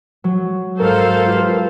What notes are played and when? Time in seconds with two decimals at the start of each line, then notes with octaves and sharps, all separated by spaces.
0.24 F#3
0.80 G#2 A4 A#4 C5 F5
1.26 F4 G4 B4